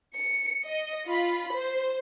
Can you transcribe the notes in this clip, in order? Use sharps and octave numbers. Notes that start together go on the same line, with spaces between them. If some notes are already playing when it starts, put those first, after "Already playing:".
C#7
D#5
F4 B5
C5